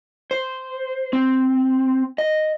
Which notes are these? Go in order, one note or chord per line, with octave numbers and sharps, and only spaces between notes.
C5
C4
D#5